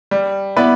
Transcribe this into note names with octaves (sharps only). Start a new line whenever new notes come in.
G3
B3 E4 B4 D5